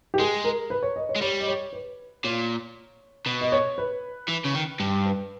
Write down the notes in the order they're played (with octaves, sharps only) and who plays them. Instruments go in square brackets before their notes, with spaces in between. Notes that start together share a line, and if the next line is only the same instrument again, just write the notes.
[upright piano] G4
[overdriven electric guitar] G#3 [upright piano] G#4
[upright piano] A#4
B4
C#5
D#5
C#5
[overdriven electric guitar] G#3
[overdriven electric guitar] G3 [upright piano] C#5
[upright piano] D#5
C#5
B4
[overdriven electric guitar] A#2 [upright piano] C#5
[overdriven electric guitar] B2
[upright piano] D#5
C#5
B4
[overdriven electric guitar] E3
C#3
D#3
G2
[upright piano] B4